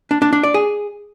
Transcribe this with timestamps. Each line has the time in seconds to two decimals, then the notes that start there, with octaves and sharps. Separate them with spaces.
0.11 D4
0.22 D4
0.33 D4
0.43 D5
0.54 G#4